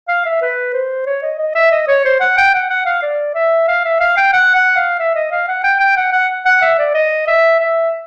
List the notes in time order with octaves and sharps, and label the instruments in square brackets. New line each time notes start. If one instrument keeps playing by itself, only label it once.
[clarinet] F5
E5
B4
C5
C#5
D#5
D#5
E5
D#5
C#5
C5
F#5
G5
F#5
F#5
F5
D5
E5
F5
E5
F5
G5
F#5
F#5
F5
E5
D#5
F5
F#5
G5
G5
F#5
F#5
F#5
E5
D5
D#5
E5
E5